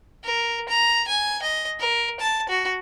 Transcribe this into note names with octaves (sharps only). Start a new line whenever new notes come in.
A#4
A#5
G#5
D#5
A#4
A5
F#4